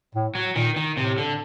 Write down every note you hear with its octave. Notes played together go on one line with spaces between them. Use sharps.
A2
F#3
A#2 D#3
D#3
A2 C3
D3